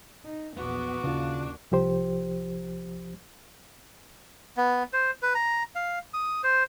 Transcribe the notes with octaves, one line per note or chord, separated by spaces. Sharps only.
D#4
A#1 E2 B3 F#4 D6
D#2 C#3 D4 F4
C2 F3 G4 C5
B3
C5
B4
A#5
F5
D#6
C5